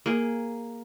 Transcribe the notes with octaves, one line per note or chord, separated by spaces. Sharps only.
A#3 G#4